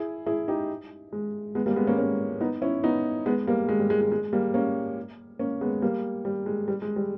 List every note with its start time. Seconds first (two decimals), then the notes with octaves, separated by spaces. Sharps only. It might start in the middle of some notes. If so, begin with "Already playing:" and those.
Already playing: E4 G#4
0.26 E4 G#4
0.48 D#4 G4
1.13 G#3
1.55 G#3 B3
1.66 G3 A#3
1.76 G#3 B3
1.87 A#3 C#4
1.98 A#3 C#4
2.41 B3 D#4
2.62 C#4 E4
2.83 B3 D#4
3.26 G#3 B3
3.47 G3 A#3
3.69 G#3
3.79 G3
3.90 G#3
4.01 G#3
4.12 G#3
4.33 G3 A#3
4.54 A#3 C#4
5.39 A#3 C#4
5.61 G#3 B3
5.82 G3 A#3
6.25 G3
6.46 G#3
6.68 G3
6.82 G#3
6.96 G3